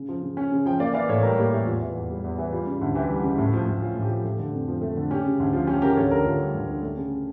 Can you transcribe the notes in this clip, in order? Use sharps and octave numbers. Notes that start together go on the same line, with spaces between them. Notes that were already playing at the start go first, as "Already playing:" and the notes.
Already playing: C#3
F3
C#3
C#4
C#3
F3 G5
A#3 D5 F5
E3 D5 F5
A2 A4 C#5
G3 G4 A#4
A#3 G4
E3 G4
E2 F4
E3
E2
G3
E2
E3
G3 F4
C#3
D2
E3 G4
G3
C#3
A2
F3
A2
C#4 F4
A2
G4
F3
A3
D3
F2
F3
A3
D3
C#4 G4
C#3
D2
F3 F4
C#4 G4
C#3 G4 A#4
D2 A4 C#5
D3 G4 A#4
D2 F4 A4
G3 G4
D2
D3
A3
C#3